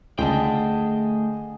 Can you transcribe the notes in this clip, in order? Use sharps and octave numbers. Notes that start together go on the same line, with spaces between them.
C#2 D3 A3 G#4 D#5 G5 A5